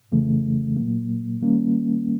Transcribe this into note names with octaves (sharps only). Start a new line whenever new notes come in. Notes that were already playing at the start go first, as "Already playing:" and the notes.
F2 C#3 E3 A3
A#2 F#3 A#3
D#3 G3 A#3 C#4